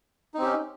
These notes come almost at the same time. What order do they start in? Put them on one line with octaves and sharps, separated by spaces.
D#4 C4 G4 C#4